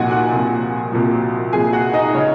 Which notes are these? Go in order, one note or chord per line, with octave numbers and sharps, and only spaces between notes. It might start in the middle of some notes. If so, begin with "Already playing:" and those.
Already playing: C2 A#2 F3 D#4 F#4 F#5 G#5
F#4 F#5
C2 A#2 F3
C2 A#2 F3
C2 A#2 F3 G#4 G#5
F#4 F#5
D#4 D#5
C#3 C#4 C#5